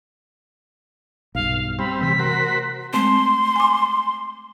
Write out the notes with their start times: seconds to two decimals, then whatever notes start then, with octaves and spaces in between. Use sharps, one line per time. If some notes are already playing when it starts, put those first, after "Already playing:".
1.35 B1 G2 F5
1.79 G3 C4 B5
2.01 C3 E3 A3 B6
2.19 F#4 A#4 C5
2.93 G#3 A3 C4 C6
3.56 G#5 D6